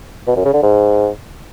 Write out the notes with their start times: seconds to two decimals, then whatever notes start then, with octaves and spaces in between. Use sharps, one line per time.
0.27 B2
0.36 F#2
0.45 C#3
0.54 D3
0.62 G#2